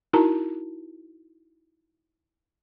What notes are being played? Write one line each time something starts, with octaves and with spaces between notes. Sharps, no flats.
D#4 E4 F#4 A#4 A5 A#5